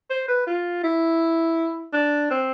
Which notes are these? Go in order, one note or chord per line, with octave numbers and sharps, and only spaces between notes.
C5
B4
F4
E4
D4
C4